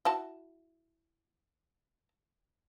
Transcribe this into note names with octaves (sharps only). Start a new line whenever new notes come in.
E4 F#4 A5